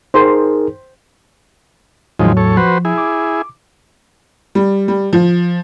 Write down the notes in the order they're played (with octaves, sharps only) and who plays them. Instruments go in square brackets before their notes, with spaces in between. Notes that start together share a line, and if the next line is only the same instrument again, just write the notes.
[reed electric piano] D#4 G#4 A#4 [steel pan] C5
[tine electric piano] E2 A2 F#3 [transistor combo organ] D#3 F3 G#3
[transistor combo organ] A4 C#5
[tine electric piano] F3 [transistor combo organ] F#4 B4 C5
[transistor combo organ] E4 G#4
[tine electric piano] D6
[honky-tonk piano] G3
G3
F3